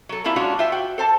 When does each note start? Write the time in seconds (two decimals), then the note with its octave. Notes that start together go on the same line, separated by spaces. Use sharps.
0.09 F#3 A4
0.24 G3 A#3 C4 E4 F4
0.36 G#3 C#4 D4 F4 F#4
0.59 F4 C5 E5 G5
0.72 F#4 G5
0.98 A4 C5 A5